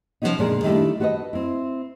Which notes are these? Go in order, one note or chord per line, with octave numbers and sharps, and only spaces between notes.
C3 F3 G#3 B3 C#4 D#4
A#2 D3 G#3 G#4 A#4 D5
D#3 G3 A3 A#3 D4 E4
F#4 A4 B4 C#5 D#5
C4 E4